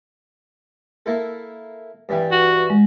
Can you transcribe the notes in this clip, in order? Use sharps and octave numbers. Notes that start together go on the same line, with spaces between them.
A#3 E4 A4
G2 E3 G3
F#4
G#3